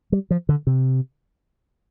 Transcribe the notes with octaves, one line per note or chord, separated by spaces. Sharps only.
G3
F3
D3
C3